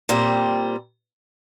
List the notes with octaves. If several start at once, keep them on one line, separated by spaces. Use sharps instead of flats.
A#2 G3 C4